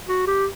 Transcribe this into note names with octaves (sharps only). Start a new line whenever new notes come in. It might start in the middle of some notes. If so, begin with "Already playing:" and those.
F#4
G4